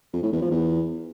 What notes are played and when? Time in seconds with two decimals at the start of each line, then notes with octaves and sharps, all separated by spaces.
0.13 F2
0.23 A2
0.32 E2
0.42 F3
0.51 E2